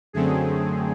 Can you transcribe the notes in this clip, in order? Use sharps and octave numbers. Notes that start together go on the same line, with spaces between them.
F#2 D3 F#3 A3 C4 G#4